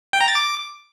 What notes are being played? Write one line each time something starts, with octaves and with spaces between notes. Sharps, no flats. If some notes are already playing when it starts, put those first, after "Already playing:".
G5
A#5
A6
D6